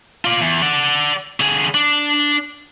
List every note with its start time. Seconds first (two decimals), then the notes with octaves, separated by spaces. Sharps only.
0.25 F4 D5
0.41 E2
0.62 D5 F#5
1.40 D3 G#4
1.74 D4